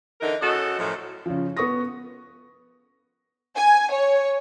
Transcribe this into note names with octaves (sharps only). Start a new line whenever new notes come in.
D3 E3 D#4 A#4
C#3 F#4 A4 D#5
F#2 A2 F3
C#3 F3
B3 B4 C#6 D#6 A#6
G#5
C#5